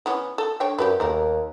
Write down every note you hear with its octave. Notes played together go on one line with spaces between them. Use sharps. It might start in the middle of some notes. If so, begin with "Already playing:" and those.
E3 B3 C#4
A4
D3 C#5 G5
F#2 G4 A4 B4
D#2 G3 A3 A#4